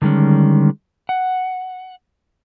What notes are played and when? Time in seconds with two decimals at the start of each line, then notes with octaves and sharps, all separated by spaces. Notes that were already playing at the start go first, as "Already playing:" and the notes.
0.02 D3 D#3 G3 G#3 C#4
1.09 F#5